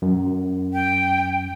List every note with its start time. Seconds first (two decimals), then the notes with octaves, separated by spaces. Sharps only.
0.02 F#2
0.74 G5